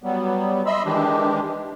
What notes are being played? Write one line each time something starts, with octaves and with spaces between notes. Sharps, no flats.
F#3 G3 B3
D#5 E5 B5 C6 E6
D#3 E3 G#3 D4 G4